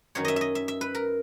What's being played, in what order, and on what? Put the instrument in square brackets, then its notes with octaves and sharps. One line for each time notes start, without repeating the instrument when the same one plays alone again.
[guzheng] F#2 D#3 F#3 C#5
D#5 E5
D#5 E5
E5
E5
B4
A#4